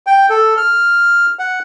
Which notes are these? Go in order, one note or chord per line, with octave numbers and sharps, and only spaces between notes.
G5
A4
F6
F#5